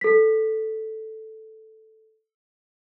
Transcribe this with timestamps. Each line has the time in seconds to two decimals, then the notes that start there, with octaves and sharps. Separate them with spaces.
0.01 A4 B6